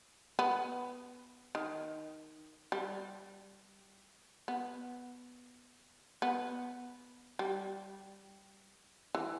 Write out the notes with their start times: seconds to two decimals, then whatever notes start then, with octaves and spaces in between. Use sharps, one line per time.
0.39 B3
1.55 D#3
2.72 G3
4.48 B3
6.22 B3
7.39 G3
9.15 E3